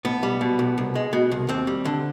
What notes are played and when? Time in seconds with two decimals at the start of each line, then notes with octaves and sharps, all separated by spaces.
0.05 B1 B3
0.23 G3
0.41 B2
0.59 B1
0.78 C2
0.95 G#3
1.13 B2
1.31 C2
1.49 D#2 C4
1.67 G3
1.85 D3